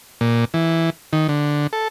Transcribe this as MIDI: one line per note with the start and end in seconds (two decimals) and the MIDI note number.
0.21 0.45 46
0.54 0.90 52
1.13 1.27 51
1.29 1.67 50
1.73 1.88 69